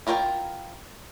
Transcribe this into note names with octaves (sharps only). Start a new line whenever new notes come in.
E4 F4 A#4 C#5 G5